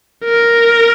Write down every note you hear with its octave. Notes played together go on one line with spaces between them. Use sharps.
A#4